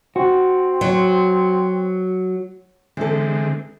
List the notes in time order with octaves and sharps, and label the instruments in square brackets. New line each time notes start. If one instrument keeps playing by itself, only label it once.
[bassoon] C4 [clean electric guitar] F#4
[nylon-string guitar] F#3
[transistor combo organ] D3 G#3 C4 [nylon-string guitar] E3 A4